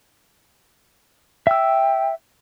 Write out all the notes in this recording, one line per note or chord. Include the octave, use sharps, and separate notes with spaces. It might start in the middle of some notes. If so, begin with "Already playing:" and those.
E5 G5 E6